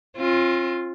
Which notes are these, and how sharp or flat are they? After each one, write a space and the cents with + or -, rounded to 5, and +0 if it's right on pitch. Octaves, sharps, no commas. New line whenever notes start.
C4 +45 F4 +0